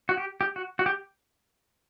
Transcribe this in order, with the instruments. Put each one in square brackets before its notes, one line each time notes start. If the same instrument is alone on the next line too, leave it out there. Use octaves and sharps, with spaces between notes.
[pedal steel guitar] F#4
G4
G4
F#4
F#4
G4